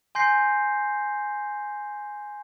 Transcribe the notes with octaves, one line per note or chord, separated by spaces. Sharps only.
G#5 C6 G6 A#6 C7